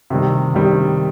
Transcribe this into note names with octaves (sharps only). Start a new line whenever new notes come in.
C3 D#3 G3
C3 D#3 G3